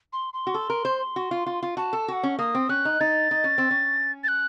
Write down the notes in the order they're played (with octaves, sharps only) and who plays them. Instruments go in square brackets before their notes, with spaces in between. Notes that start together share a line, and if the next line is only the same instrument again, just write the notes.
[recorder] C6
C6
[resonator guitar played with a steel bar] F#4
A4
A#4
C5
F#4
F4
F4
F4
[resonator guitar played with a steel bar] F#4 [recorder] A5
[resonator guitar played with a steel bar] A4
[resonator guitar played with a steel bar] F#4 [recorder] F#5 A5
[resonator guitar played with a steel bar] C#4
[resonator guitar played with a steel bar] A#3 [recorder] D#6
[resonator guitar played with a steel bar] C4
[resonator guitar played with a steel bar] C#4 [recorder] F#6
[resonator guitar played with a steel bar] D#4
[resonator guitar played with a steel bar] D#4 [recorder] A6
[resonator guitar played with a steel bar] D#4
C#4
C4
C#4
[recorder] A6
F#6